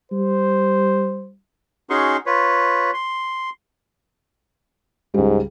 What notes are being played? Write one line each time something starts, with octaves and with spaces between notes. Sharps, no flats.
G3 C5
C#4 D#4 F#4 G#4 C6 C#6
F4 B4 C#5
C6
C#2 G#2 G3